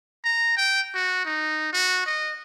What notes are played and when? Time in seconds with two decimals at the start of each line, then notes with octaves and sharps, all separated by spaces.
0.24 A#5
0.57 G5
0.94 F#4
1.25 D#4
1.73 F#4
2.06 D#5